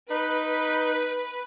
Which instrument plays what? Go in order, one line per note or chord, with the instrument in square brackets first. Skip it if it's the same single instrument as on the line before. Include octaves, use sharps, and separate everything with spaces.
[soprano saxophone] D#4 [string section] B4